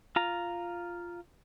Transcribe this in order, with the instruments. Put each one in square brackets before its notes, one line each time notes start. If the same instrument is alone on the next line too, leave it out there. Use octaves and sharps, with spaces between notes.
[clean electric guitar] F4 A#5